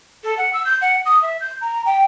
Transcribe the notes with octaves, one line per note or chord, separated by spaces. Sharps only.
A4
F#5
E6
G6
F#5
D#6
E5
G6
A#5
G5